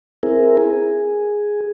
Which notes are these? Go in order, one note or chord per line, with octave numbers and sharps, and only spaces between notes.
C4 E4 G#4 A#4
G#4